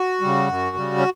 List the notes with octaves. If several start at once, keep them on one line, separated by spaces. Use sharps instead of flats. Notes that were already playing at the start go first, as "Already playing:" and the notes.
Already playing: F#4
C#3 G3
F#2
C#3 G3
C#4